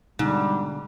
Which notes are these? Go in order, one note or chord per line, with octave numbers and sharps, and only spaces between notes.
G#2 B2 D3 G3